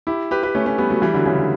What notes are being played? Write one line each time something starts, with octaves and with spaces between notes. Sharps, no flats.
E4 G4
G4 B4
G4 B4
A3 C#4
A3 C#4
G3 B3
F#3 A3
E3 G3
D3 F#3
C#3 E3
D3